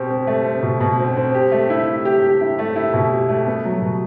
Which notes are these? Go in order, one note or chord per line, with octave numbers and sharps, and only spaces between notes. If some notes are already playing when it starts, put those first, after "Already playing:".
Already playing: B2 C4 G4
C4
A3
C4
B2
B2
C4
C4
G4
A3
E4
E4
G4
G4
E4
A3
E4
B2
G4
A3
B3
F#3
B2